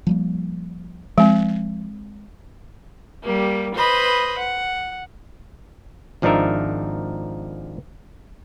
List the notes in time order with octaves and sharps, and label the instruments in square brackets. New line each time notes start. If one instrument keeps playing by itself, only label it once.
[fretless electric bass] F3 G3 A#3
[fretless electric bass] F3 [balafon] G#3 C4
[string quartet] G3 A#3 G4
B4 C5 D#5 B5
F#5
[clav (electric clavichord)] G#1 F3 D4 D#4 A#4 E5